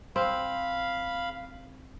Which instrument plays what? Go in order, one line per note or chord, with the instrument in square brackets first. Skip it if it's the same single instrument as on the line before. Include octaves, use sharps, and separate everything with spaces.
[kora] C4 [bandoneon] F5 B5